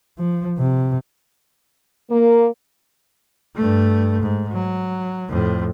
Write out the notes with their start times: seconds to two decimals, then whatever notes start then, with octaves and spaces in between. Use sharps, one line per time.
0.18 F3
0.58 C3
2.10 A#3
3.57 G2 A3
4.22 G#2
4.53 F#3
5.29 F2 A2